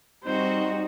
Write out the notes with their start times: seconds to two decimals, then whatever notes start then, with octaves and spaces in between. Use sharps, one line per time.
0.24 G3 C4 D#4 F#4 C5